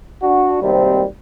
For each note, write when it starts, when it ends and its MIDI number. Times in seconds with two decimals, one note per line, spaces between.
0.22 0.60 62
0.22 0.60 66
0.62 1.03 32
0.62 1.03 39
0.62 1.03 48
0.62 1.03 55
0.62 1.03 60